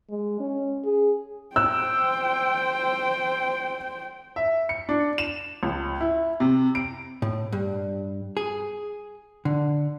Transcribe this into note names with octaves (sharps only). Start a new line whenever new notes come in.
G#3
C#4
G#4
C5 G5 E6 F#6
E5
C#7
D4
E7
C#2
E4
C3
D7
A2
G2
G#4
D3